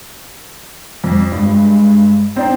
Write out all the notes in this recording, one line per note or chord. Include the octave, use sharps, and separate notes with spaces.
F2
G2 G#3
C4 D4 D#4 G5